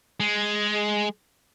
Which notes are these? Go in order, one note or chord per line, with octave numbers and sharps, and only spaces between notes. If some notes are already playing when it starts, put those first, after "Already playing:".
G#3